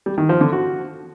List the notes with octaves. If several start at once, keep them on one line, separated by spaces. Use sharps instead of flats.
G3
D#3
F3
D3
F#4